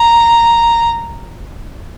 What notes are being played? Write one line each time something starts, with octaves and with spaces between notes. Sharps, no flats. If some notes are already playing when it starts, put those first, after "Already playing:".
Already playing: A#5